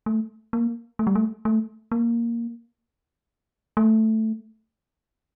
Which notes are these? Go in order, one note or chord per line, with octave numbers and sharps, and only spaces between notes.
A3
A#3
A3
G3
A3
A3
A#3
A3